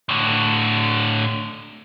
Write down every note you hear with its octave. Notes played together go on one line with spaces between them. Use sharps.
A2 D3